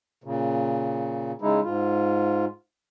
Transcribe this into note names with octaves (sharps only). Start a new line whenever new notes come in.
A#2 C#3
C#3 G#3 D#4 E4
G#2 F4